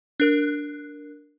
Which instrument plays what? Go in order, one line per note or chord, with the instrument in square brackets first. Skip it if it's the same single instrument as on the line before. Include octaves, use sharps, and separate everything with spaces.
[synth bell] D4 A#4 F#6